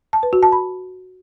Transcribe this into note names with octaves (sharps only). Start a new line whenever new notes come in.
A5
B4
F#4
A5
B5